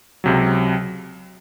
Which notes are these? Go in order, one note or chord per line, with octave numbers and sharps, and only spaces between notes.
C#2 C3 F#3